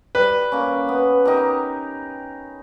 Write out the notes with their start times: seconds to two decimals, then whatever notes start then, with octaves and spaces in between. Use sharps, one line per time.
0.15 G3 B4
0.52 A#3 C#4
0.89 B3
1.25 D#4 G4 A#4